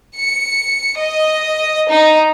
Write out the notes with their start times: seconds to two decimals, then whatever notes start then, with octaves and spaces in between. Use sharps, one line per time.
0.18 C#7
0.99 D#5
1.90 D#4